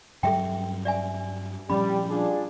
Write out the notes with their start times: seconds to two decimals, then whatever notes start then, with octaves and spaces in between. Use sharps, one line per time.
0.23 G2 F#3 G3 A4 E5 G5
0.85 D5 E5 G#5
1.70 A#2 F3 G3 C#4 B5
2.10 D4 F4 G#4